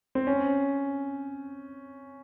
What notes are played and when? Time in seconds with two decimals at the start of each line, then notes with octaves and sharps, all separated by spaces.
0.15 C4
0.27 C#4